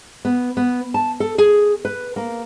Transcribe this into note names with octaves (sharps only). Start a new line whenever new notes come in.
B3
B3
A5
A4
G#4
B4
A#3